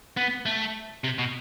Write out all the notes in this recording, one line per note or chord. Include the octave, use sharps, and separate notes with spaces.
B3
A3
C3
B2